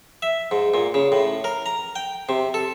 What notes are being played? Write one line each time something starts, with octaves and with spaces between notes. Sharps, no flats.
E5
G#2
A#2
C#3
A2
A#4
A#5
G5
C3
A4